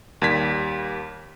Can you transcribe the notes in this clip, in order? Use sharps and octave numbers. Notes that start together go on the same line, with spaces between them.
D#2 G3 G#6 B6